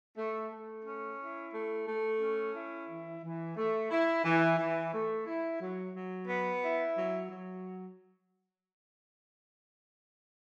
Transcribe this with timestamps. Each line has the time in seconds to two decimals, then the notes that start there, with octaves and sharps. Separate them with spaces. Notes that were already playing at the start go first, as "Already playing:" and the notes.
0.16 A3
0.50 A3
0.85 C#4
1.19 E4
1.52 A3
1.87 A3
2.20 C#4
2.54 E4
2.88 E3
3.22 E3
3.57 A3
3.91 E4
4.24 E3
4.58 E3
4.92 A3
5.26 E4
5.60 F#3
5.94 F#3
6.28 B3
6.61 E4
6.96 F#3
7.29 F#3